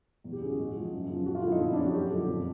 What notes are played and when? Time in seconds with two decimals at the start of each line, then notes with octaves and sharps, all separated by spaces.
0.24 E2
0.32 G4
0.41 C#3 G#4
0.45 E3 F#4
0.59 G#2
0.75 F3
0.92 F#2
1.09 C#3 F3
1.26 F#2 F#4
1.35 F4
1.43 D3 F3 E4
1.52 D#4
1.60 F2 E4
1.73 D4
1.77 C#3 F3 C#4
1.85 F#4
1.94 F#2 G4
2.11 D3 F3
2.27 F2